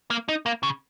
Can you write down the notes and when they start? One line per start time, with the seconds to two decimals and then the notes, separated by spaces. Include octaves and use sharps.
0.11 A#3
0.29 D#4
0.46 A#3
0.63 C#3